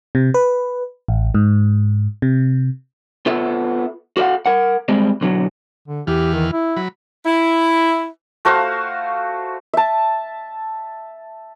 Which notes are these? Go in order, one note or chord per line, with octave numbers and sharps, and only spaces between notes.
C3
B4
A1
G#2
C3
B3 F4 A4 E5
F#4 A4 C#5 F5 F#5
A#4 F#5
G3 G#3 C4
B1 D3 F#3
D3
E2 E3 G4 F6
D#3
E4
F#3 B5
E4
A3 F#4 C5 F5
E5 A5